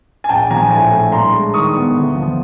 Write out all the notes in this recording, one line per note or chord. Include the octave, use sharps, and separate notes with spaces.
G#5
A#1 G5 A5
F3 G#5 A#5
A2 G#5 A#5
A3
G2 A#5 C6
G#3
D#3 C#6 D#6
B3
D2
F3